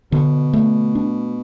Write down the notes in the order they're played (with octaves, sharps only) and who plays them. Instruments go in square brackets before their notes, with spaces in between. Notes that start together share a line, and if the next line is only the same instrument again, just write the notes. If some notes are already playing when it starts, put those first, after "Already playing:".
[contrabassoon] B2 [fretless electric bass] D3
[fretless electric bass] A3
D4